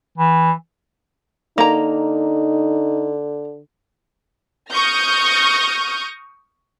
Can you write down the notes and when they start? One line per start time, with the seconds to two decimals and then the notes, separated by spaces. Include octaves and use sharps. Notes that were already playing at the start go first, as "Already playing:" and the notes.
0.18 E3
1.58 D3 A#3 D#4 A#5
4.70 C#6 D#6 F6 G6 A#6